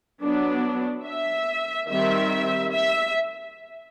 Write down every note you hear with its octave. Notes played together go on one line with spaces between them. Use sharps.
F#3 B3 D4
E5
D#3 G3 C4 E5
E5